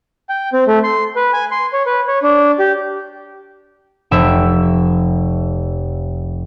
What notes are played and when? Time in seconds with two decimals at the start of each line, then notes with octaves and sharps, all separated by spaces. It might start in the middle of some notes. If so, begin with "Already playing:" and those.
0.29 G5
0.53 C4
0.68 A3
0.84 C6
1.16 B4
1.33 G#5
1.51 C6
1.73 C#5
1.86 B4
2.07 C#5
2.23 D4
2.59 G4
4.11 F1 E5